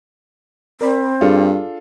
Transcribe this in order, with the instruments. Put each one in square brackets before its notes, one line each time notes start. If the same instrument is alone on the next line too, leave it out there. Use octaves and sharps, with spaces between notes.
[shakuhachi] C4 [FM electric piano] A#4 D5 B5
[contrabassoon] G2 [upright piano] D4 F4 A4 [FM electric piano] G#4